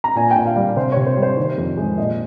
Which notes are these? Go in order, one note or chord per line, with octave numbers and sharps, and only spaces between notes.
A#5
A#2 G#5
G5
A#2
F5
G3
C3 C5
C3 C#5
C5
G3
C5
D#3
F2
G#3
A#2 D#5